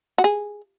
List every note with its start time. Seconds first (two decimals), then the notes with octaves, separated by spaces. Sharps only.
0.18 F#4
0.24 G#4